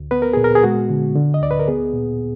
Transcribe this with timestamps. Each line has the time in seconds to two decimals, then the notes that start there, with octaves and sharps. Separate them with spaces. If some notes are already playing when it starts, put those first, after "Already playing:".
Already playing: D2
0.11 B3 B4
0.22 A#4
0.33 A#2 G#4
0.44 A#4
0.55 G#4
0.64 G#3 F#4
0.89 D3
1.15 D3
1.34 D#5
1.41 D2 D5
1.51 B4
1.59 A#4
1.68 B3 G#4
1.94 A#2